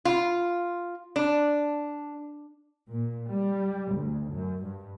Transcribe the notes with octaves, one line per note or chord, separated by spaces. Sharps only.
F4
D4
A#2
G3
D2
F#2
G2